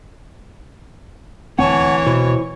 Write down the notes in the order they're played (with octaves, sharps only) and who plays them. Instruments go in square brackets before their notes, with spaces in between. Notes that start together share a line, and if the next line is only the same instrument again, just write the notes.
[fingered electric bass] D#1 D2 C4 [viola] E3 C#5 [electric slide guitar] F#5 G#5 A5
[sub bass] B2 [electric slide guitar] E4 C5